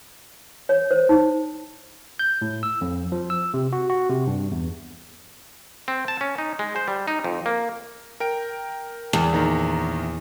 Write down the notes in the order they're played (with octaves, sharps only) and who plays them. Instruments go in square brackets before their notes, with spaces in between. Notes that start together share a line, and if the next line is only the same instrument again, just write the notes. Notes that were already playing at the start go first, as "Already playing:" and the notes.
[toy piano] C#5
C5
D#4
[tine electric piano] G6
A2
E6
F2
F3
E6
C3
F#4
F#4
C3
G2
E2
[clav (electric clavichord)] C4
A5
C#4
D#4
G#3
C5
G3
D#4
F2
A#3
[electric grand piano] A#4 G5 D7
[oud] E2
[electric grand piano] A#1 D#3 A#5